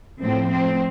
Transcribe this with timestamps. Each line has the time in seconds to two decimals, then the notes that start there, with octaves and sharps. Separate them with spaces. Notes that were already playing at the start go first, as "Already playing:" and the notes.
0.21 A2 F3 C4
0.50 C4